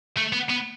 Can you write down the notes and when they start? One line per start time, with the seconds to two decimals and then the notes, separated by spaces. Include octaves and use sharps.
0.17 A3
0.33 B3
0.49 B3